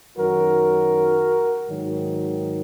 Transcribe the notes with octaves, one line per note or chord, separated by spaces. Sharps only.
F#2 D#3 F#3 F#4 A#4
G#2 D#3 F#3